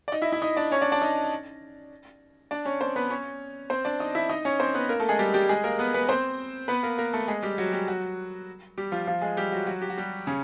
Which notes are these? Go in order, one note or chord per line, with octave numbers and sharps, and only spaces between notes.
D5
D#4 D#5
E4 E5
E4 E5
D#4 D#5
D4 D5
C#4 C#5
D4 D5
D4 D5
D#4 D#5
D4 D5
C#4 C#5
C4 C5
B3 B4
C#4 C#5
C4 C5
D4 D5
D#4 D#5
E4 E5
D#4 D#5
C#4 C#5
C4 C5
B3 B4
A#3 A#4
A3 A4
G#3 G#4
G3 G4
G3 G4
G#3 G#4
A#3 A#4
B3 B4
B3 B4
C4 C5
B3 B4
A#3 A#4
A#3 A#4
A3 A4
G#3 G#4
G3 G4
F#3 F#4
G3 G4
F#3 F#4
G3 G4
F3 F4
F3 F4
G#3 G#4
G3 G4
F#3 F#4
F#3 F#4
G4
F#4
G3 G4
C#3 C#4